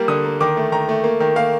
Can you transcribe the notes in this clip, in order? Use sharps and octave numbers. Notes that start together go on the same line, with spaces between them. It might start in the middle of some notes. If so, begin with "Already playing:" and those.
Already playing: G3 A#3
D3 D#6
A#3
D#3 D6
A3
D#3 A#5
A3
A#3
D#3
A#3 F5